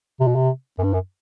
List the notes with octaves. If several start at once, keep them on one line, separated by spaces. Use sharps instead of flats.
C3
B2
C3
F#2
G2
F#2